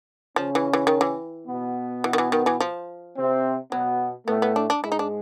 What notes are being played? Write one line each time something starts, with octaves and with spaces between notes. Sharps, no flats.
C#3 F3 C#4
E3
E3
D#3
E3
B2 B3
E3
D#3
E3
D#3
E3
F3
C3 C4
B2 F#3 B3
A2 A3 B3
B3
D4
D4
G#2 G#3 E4
D#4
D4